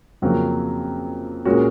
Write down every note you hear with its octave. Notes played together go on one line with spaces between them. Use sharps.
F2 C#3 F#3 A#3
A#2 G#3 C#4 F#4 A#4